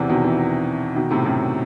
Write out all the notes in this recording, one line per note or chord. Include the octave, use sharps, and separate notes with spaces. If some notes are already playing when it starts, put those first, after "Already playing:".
Already playing: E2 C3 E3
B2 D#3
C3 E3
B2 D#3
A2 C3
F#2 A2